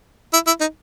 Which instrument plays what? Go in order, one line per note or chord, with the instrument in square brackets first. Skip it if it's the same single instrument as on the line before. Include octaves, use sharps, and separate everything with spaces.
[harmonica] E4
E4
D#4